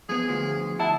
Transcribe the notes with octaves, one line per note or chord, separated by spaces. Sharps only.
F2 B3 G#4
D2 F3
E4 F#5 A5